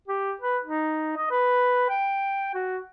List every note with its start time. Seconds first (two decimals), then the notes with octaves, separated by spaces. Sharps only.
0.08 G4
0.41 B4
0.64 D#4
1.17 D#5
1.31 B4
1.89 G5
2.54 F#4